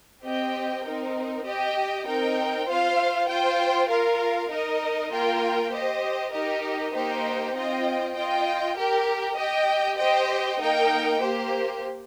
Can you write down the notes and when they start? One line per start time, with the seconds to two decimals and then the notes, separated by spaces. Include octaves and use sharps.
0.23 C4 G4 D#5 G5
0.84 C4 D#4 A#4
1.45 G4 D#5 G5
2.06 C4 D#4 A#4 G5
2.67 F4 C5 F5
3.28 F4 C5 G5
3.89 F4 A#4 F5
4.50 D#4 A#4 D#5
5.10 A#3 F4 A#4 G5
5.71 G4 C5 D#5
6.32 D#4 G4 A#4 D#5
6.94 A#3 D#4 G4 C5 G5
7.54 C4 F4 D#5 G5
8.15 F4 D#5 G5
8.76 G4 A#4 G5
9.37 G4 D#5 G5
9.98 G4 C5 D#5 G5
10.58 A#3 D#4 A#4 G5
11.20 A#3 G4 C5